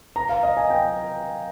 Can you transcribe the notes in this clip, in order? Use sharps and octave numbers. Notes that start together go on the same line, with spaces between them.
A#5
F5
D#5
G#5
G5